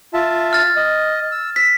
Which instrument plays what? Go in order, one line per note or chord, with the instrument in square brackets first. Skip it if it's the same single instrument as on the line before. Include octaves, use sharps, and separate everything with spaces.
[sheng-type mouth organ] F4 E5 A5
[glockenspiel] F6 A6
[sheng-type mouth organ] D#5
E6
[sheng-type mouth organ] E6 [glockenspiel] B6